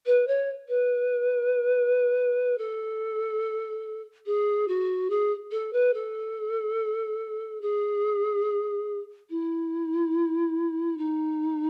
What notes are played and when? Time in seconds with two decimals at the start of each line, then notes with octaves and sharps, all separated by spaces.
0.06 B4
0.27 C#5
0.68 B4
2.58 A4
4.26 G#4
4.68 F#4
5.10 G#4
5.51 A4
5.73 B4
5.94 A4
7.61 G#4
9.30 E4
10.97 D#4